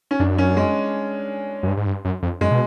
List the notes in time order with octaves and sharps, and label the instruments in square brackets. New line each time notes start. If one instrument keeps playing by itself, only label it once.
[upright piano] C#4
[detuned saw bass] F#2 [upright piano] D4
[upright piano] C#4
G#3
[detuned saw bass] F#2
G2
G#2
G2
F#2
F2
[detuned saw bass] F#2 [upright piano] G#3
[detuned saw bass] B2